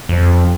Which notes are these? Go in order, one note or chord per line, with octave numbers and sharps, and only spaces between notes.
F2